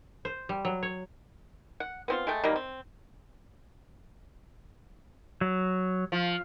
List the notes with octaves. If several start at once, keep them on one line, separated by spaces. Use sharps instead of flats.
C5
G3
F#3
C#5
F#5
B3 C4 F4
G#3 A3 G5
D#3 F#3 G3 A#3
C4
F#3
F3